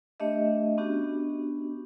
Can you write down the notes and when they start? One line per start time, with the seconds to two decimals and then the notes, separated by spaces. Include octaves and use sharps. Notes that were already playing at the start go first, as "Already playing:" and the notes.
0.20 A3 D4 G4 D#5 E5
0.78 B3 C#4 D4 F#4 G4